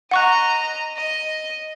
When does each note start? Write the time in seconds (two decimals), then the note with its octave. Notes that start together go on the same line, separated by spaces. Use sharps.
0.11 D#5 F#5 A#5 C#6 F#6
0.97 D#5